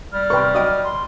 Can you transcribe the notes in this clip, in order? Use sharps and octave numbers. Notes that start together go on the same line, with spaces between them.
G3 F6
C3 A#4 B4 G5 C#6
F#3 D#5 G5 D6 D#6
C6